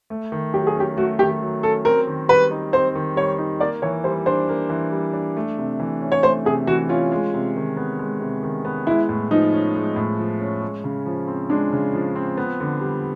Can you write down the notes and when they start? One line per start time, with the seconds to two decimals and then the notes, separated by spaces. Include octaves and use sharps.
0.10 A3
0.32 D#3
0.54 F#3 G4
0.67 G#4
0.76 C#4 G4
0.97 A3 F#4
1.19 D#3 G4
1.42 F#3
1.63 C#4 A4
1.85 C4 A#4
2.07 D#3
2.28 G3 B4
2.51 D#4
2.73 C4 C5
2.95 D#3
3.16 G3 C#5
3.38 D#4
3.60 A#3 D5
3.82 E3 C#5
4.04 G3 C5
4.26 D4 C5
4.49 A#3
4.70 E3
4.92 G3
5.13 D4
5.37 A3
5.58 C3
5.80 E3
6.01 C#4
6.12 C#5
6.23 A3 C5
6.45 C3 G#4
6.67 E3 F#4
6.89 C#4 F4
7.12 G#3
7.34 C3
7.56 D#3
7.77 B3
7.99 G#3
8.20 C3
8.43 D#3
8.65 B3
8.87 G#3 E4
9.09 A2
9.31 F3 D#4
9.53 C#4
9.75 G#3
9.96 A2
10.19 F3
10.41 C#4
10.62 G#3
10.84 C#3
11.06 F3
11.28 C4
11.50 G#3 D4
11.72 C#3
11.94 F3
12.16 C4
12.37 B3
12.60 D3
12.81 G3